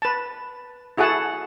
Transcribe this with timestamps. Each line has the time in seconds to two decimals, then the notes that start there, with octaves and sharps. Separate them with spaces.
0.02 B4 A5
0.97 E4 F#4 G#4 A4 F#5 A5